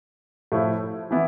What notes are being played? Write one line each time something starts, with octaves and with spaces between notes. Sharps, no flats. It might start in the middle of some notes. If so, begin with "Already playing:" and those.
A2 F3 A3 E4
E3 B3 E4